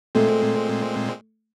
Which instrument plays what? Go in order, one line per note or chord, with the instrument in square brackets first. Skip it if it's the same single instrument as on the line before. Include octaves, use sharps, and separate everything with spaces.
[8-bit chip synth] A#2 G#3 C4 [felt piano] A3